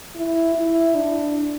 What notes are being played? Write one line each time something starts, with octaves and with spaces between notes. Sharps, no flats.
E4
E4
D4